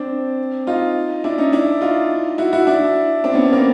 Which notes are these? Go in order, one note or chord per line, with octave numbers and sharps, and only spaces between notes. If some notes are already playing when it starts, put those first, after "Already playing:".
Already playing: C4 D4
D#4 F4
D4 E4
C#4 D#4
D4 E4
D#4 F4
E4 F#4
E4 F#4
D4 E4
C4 D4
B3 C#4
B3
A#3 C4